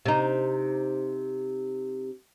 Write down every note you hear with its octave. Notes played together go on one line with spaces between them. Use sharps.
C3 D#4